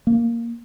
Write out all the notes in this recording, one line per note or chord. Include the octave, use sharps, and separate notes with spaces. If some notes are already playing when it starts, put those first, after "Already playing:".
A#3